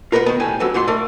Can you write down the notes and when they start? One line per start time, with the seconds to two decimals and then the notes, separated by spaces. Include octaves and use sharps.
0.12 F4 A#4 B4 D5 F#5
0.26 D#3 B3
0.40 A2 G3 G#5
0.60 F2 D3 F#3 B4
0.74 G#2 F4 F#5 C6
0.88 A3 A#4 D5